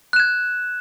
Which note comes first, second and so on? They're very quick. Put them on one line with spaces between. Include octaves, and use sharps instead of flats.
F#6 E7 G#6